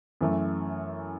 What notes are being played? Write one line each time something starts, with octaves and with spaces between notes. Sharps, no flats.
F#2 E3 A3